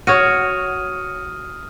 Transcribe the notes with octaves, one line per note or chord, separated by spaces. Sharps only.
F#4 C#5 D#6 F6 D#7